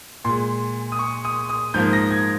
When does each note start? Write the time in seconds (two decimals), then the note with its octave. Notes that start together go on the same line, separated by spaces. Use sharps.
0.24 A#2 G#3 C6
0.92 D#6
0.99 C#6
1.25 D#6
1.49 D#6
1.74 G#2 F3 A#3 G6
1.93 A#6
2.11 G#6